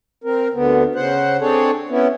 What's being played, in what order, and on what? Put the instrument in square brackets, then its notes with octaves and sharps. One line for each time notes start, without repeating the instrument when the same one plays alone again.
[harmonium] C4 A#4
D2 D3 B3
C#3 C5 F#5
C4 D4 G#4 A4 C#5
B3 C#4 E4